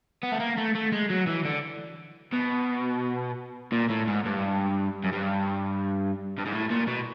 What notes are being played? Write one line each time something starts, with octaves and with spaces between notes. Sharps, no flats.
B3
A3
A#3
A3
A3
G#3
F#3
E3
D3
B2
A#2
A2
G#2
G2
F#2
G2
G2
G#2
A2
A#2
B2